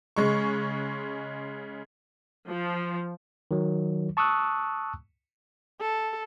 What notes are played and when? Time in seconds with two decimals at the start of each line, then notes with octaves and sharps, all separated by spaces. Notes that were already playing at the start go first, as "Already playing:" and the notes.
0.16 C#3 G#3 C#6
2.49 F3
3.51 D#3 F#3
4.17 A5 C#6 D#6 E6 F#6
5.81 A4